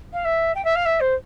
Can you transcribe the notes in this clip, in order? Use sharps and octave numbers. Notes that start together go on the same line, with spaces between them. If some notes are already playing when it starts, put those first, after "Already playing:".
F5
E5
G5
E5
F5
E5
C5